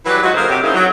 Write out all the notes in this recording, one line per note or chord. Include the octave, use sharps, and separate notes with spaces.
E3 F#3 G3 B4
G#2 F#3 D#4 F4 F#4
D3 A#3 G#4 A#4 C5
C3 F#3 G4
C#3 A#3 C4 D#4 E4 G#4
F#3